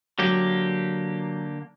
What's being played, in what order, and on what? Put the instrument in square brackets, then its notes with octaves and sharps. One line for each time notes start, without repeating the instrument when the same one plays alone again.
[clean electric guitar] D3 A#3 G4 [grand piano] F#3